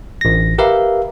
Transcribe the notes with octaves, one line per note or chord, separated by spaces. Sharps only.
A1 A#6
G4 A#4 B4 E5 F5